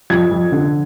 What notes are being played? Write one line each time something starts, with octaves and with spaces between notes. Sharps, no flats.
F2 G#6
F2
D3